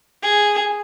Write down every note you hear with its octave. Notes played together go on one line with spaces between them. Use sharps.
G#4